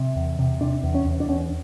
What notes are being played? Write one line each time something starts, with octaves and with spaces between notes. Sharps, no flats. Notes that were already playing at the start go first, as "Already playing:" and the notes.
Already playing: C3
E2
C3
C3 D4
E2
C#4
E2
D4
E2 C#4